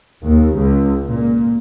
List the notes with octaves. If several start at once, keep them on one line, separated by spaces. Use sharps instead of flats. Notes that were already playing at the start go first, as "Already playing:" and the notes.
D#2
C#2
A#2